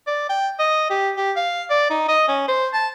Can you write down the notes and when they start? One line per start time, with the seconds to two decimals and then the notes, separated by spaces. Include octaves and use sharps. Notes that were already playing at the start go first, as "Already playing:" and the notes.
0.07 D5
0.29 G5
0.59 D#5
0.90 G4
1.17 G4
1.36 F5
1.70 D5
1.90 D#4
2.08 D#5
2.28 C#4
2.48 C5
2.73 A5